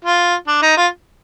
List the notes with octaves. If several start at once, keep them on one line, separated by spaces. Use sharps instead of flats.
F4
D4
D#4
F4